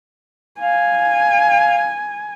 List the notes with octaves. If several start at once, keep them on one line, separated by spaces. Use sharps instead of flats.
F5 G#5